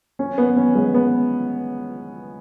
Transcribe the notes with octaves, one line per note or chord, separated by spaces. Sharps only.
C#4
B3
C#4
G#3
B3